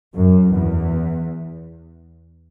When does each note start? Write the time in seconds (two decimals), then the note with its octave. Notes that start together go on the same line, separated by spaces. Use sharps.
0.15 F#2
0.52 E2